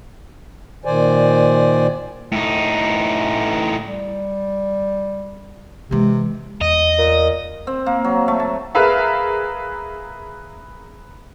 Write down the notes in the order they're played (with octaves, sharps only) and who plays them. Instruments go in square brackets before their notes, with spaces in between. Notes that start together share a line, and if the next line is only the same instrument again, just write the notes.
[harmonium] A#2 D#3 C5 D5 G#5
[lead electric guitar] A2 D#4
[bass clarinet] G3
[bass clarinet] C3 [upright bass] E3 G#3
[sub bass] E2 [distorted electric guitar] D#5
[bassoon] A#2
[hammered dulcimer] C4
A#3
F#3
A3
A5
[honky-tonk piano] G#4 A#4 B4 E5 F5